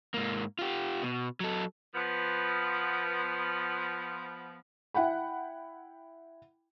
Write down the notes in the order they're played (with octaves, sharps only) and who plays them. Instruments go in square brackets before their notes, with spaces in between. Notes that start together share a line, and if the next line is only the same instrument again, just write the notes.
[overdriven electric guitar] G#2 A#3
F4 G4
B2
F#3 A4
[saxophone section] F3 B3
[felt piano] E4 F#5 G5 B5